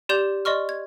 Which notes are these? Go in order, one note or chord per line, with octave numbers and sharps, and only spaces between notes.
G4 D5 C6 G6 E7 F7
D5 D#5 C6 C#6 F6
G#6